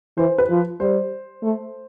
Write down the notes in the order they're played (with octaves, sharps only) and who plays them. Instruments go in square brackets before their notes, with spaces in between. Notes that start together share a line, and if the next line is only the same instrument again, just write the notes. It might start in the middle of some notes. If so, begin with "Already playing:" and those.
[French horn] E3 [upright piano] C5
[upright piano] B4
[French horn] F3
[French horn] G3 [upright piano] C5
[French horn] A3